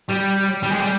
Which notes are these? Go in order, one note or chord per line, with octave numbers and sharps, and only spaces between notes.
G3
G3
G#3
G3